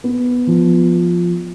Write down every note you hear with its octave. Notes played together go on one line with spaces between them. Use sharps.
B3
F3